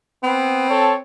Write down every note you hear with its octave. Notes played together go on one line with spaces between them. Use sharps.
B3 C4 B4
A4 C#5